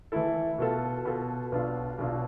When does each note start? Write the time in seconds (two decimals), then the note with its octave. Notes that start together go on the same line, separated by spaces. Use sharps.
0.12 E3 A3 E4 A4
0.58 B2 B3 F4 A4
1.05 B2 B3 F4 A4
1.52 B1 B2 B3 D4 F4
1.98 B1 B2 B3 D4 F4